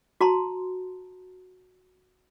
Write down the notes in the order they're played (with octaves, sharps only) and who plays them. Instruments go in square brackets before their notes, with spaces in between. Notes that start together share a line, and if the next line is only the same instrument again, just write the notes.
[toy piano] F#4 A5 A#5 C6